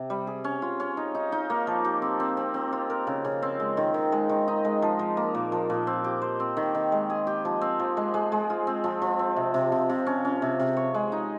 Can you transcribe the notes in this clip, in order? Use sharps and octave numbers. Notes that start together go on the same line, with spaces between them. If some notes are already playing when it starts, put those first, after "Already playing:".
Already playing: C3
G3
G#4
C#4
F4
C#4
D#4
D#4
D#4
A#3
F3
G4
C4
C4
C4
C4
F4
A#4
C#3
C#3
C4
G#3
D#3
D#3
G#3
D#3
D#4
G#3
F3
F3
A#3
A#2
F3
A#2
C4
G4
C5
C4
D#3
D#3
G#3
G#4
G4
F3
C4
F3
G#3
G#3
G#3
F4
C4
F3
F3
C4
C3
C3
C3
C3
C#4
C#4
C3
C3
C#5
G#3
D#4